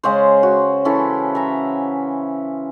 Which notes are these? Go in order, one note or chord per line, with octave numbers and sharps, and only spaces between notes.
C#3 G#3 C#4 C5
F#4
E3 C#4 E4 A4
E5 A#5